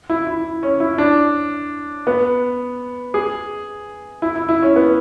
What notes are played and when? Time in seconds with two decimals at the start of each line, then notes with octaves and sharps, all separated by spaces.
0.10 E4
0.27 E4
0.63 C#4
0.80 E4
0.98 D4
2.07 B3
3.14 G#4
4.22 E4
4.36 E4
4.49 E4
4.62 C#4
4.76 B3